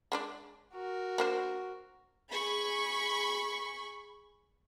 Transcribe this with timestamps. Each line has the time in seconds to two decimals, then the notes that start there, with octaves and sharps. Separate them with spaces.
0.12 G#3 D4 D5
0.73 F#4 A#4
1.18 A#3 D4 C5
2.30 G#4 B5 C#6